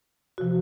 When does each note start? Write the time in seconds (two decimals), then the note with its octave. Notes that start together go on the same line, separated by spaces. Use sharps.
0.38 C3 F3 F#4